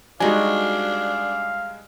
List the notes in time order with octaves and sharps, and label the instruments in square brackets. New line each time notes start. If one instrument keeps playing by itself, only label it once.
[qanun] G3 F#4 [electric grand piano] G#3 D#4 G#5 [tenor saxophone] D4 [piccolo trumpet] F5